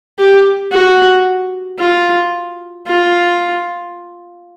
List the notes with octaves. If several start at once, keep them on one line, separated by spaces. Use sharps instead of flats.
G4
F#4
F4
F4